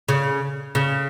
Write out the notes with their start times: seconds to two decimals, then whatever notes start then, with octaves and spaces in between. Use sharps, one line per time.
0.09 C#3
0.75 C#3